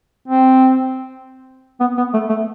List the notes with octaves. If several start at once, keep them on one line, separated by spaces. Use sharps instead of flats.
C4
B3
B3
A3
A3